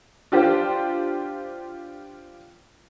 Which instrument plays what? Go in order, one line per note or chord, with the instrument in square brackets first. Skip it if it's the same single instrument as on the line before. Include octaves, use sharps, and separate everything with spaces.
[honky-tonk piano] D4 F4 G4 C5